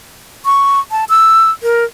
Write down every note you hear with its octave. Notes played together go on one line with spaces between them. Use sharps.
C#6
A5
E6
A#4